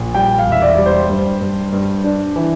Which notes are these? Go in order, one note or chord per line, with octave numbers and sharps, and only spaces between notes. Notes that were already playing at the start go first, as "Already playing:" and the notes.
Already playing: A#1
G3 G5
F5
E1
E5
D5
G3 D5
C5
G2
G2
G2
D4
E3